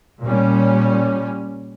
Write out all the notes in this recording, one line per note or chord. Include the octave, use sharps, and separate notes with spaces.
A#2 G3 C#4